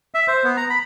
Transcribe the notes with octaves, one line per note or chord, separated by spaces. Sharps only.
E5
C5
B3
A#5
B5